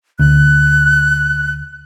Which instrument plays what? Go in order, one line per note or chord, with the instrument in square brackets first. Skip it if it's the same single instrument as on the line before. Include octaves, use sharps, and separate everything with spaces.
[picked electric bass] D2 [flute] F#6